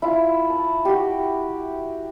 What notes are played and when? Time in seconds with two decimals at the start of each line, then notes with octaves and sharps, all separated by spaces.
0.02 E4 F4
0.50 A5
0.85 F#4 G4